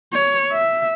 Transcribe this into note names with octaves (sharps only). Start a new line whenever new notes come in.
C#5
E5